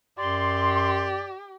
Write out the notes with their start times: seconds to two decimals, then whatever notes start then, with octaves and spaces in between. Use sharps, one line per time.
0.18 F#2 G4 D5 C6